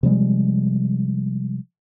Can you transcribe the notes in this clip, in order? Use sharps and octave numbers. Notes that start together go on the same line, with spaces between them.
C3 F3 G3 G#3